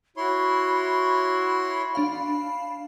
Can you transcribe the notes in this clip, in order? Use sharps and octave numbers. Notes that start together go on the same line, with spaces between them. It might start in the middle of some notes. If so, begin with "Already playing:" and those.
E4 F#4 C#5 B5 C6
D4 F5